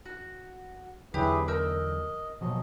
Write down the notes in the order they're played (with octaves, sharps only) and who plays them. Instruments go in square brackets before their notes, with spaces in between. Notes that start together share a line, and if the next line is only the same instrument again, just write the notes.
[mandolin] F#4
[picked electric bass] E2 D3 F#3 [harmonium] E4 G#4 B4 [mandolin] G4
[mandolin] A#4 E6 G6 [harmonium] D#5
[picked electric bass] B2 F3 F#3 [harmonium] D#5